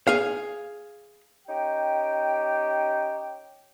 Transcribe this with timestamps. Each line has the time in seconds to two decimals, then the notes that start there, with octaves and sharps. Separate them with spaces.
0.07 G#4 F5
1.47 C#4 D#4 G4 G5